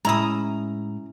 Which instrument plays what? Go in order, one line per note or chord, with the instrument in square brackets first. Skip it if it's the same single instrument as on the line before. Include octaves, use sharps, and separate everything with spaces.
[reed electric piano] A2 G#3 [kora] C#4 E4 [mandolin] A#5 D#6